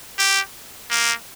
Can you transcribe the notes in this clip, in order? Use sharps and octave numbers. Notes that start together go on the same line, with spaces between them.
G4
A#3